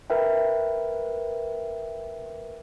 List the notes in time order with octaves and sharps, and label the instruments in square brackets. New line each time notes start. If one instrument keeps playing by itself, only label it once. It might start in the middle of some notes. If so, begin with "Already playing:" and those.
[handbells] A#4 B4 E5 G5